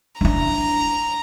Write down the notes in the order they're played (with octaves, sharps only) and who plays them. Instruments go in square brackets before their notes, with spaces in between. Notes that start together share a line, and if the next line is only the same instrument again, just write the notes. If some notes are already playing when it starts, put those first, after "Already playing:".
[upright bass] D4 E4 [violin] A#5